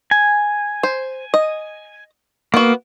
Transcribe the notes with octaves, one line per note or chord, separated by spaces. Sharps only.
G#5
C5
D#5
A#3 B3 F#4